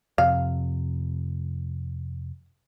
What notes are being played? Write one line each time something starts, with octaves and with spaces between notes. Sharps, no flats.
F2 C3 F5